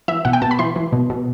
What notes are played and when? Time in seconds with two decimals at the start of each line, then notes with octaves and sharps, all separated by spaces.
0.08 E3 E5
0.25 B2 F#5
0.33 G5
0.42 B2 A5
0.51 B5
0.59 E3 C6
0.76 E3
0.92 B2
1.10 B2